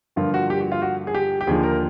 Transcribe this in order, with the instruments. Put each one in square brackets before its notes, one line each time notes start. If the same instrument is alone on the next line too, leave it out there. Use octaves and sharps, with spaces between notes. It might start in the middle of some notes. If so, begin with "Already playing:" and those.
[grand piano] G2 D3 F3 A#3 F4
F#4
G4
F#4
F4
F#4
G#4
G4
G4
D#2 D3 F3 G#4
A#4